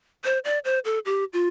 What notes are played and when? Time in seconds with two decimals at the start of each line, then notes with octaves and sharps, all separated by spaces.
0.24 C5
0.45 D5
0.65 C5
0.85 A4
1.05 G4
1.33 F4